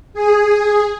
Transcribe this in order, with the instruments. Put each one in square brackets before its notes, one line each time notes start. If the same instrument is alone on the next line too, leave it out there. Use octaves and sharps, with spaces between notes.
[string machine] G#4